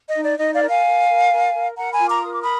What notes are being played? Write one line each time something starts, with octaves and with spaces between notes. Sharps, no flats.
D#5
D#4
D5
D#4 D#5
D5 F5
A#4
F5 G#5
A#4
A#4
A#4
A#4
A#4 F#5 A#5
G#5 B5
F4
A#5 D6
A#4 D#6
D6
B5 D#6